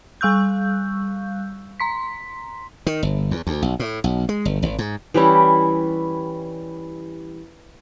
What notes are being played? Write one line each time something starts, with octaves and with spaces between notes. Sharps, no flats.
G3 F5 C#6 E6 F#6 G6
A#5 C6 B6
D#3
G1
E2
D2
B1
A2
B1
G#3
G1
G#1
G#2
E3 G3 C#4 E4